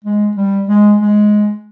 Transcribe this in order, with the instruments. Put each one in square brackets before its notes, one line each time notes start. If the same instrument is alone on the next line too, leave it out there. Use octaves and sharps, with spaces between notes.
[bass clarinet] G#3
G3
G#3
G#3